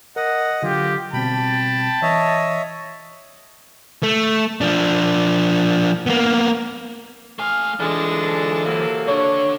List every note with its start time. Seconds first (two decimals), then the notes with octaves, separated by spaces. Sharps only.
0.16 A#4 D#5 F#5
0.63 D3 F#3 F4 G4
1.13 B2 G3 C4 G5 A5 B5
2.02 E3 C#5 D#5 E5
4.03 A3
4.61 F3 D4
6.06 A#3 B3
7.39 A3 F5 G#5
7.80 E3 G#3 D4 F4 A4
8.66 C3 F#3 A#3
9.08 D3 D4 C#5